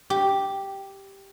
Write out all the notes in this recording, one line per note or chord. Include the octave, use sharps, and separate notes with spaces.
G4